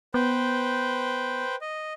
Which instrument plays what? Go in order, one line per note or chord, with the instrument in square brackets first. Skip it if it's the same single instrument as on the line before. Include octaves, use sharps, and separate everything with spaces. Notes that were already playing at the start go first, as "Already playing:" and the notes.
[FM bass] B3 [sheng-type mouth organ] B4 C5 G5
[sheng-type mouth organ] D#5